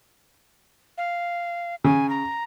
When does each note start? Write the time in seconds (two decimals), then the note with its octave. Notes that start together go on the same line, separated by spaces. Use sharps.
0.98 F5
1.84 C#3 G#5
2.09 A#5